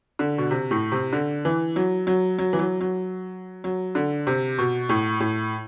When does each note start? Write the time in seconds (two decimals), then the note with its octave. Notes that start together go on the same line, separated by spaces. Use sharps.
0.19 D3
0.38 B2
0.51 C3
0.71 A2
0.92 C3
1.13 D3
1.45 E3
1.76 F#3
2.07 F#3
2.39 F#3
2.53 E3
2.59 F#3
2.81 F#3
3.64 F#3
3.95 D3
4.27 C3
4.58 B2
4.89 A2
5.20 A2